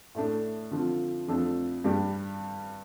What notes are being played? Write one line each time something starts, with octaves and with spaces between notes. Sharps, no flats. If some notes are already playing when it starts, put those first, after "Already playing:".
A2 A3 D4
D3 F3 C4 F4
F2 F3 A3 D4 A4
G2 G3 D4 G4